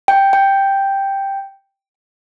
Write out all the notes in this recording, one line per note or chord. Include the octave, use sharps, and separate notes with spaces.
G5
G5